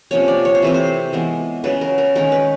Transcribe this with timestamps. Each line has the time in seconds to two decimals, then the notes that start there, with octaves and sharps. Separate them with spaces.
0.11 C3 F3 A#3 C#4 C#5
0.28 D5
0.45 C#5
0.55 C5
0.62 C3 E3 A3 C4 B4
0.74 C5
1.13 E3 G#3 B3
1.64 C#3 F#3 B3 B4
1.81 A#4
1.98 A#4
2.15 D#3 G#3 C#4 A#4
2.32 B4